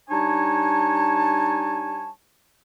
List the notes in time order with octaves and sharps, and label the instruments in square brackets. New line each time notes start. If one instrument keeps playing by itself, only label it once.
[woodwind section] G3 D4 D#4 C#5 G#5 A5